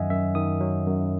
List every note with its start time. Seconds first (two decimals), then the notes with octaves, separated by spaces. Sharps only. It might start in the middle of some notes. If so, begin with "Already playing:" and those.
Already playing: F#2 D#3 F#3 D#5 E5 F#5 G#5
0.10 F#2 E5
0.35 D#3 D#6
0.60 F#3
0.86 F#2